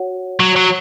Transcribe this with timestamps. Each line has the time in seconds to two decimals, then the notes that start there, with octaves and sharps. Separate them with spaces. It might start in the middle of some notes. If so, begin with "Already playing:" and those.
Already playing: F#4 C#5 F#5
0.40 F#3
0.56 F#3